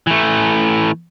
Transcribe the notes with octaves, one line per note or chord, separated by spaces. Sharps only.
E3 A3